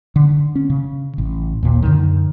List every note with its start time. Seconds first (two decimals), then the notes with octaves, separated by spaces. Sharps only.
0.16 D3
0.55 C#4
0.70 C#3
1.18 A1
1.63 D#2 A#2
1.82 F#2 B2 D3 D#3